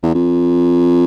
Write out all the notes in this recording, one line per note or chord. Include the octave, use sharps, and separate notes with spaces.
E2
F2